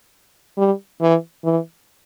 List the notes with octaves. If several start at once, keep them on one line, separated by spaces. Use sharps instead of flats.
G3
E3
E3